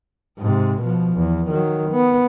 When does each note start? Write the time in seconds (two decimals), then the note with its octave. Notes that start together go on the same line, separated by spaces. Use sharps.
0.39 G#2 C3
0.82 B2 F3
1.14 E2
1.50 D#3 F#3
1.91 B3